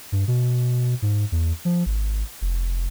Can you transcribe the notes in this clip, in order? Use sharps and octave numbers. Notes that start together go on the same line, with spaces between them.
G2
B2
G#2
E2
F3
G#1
F1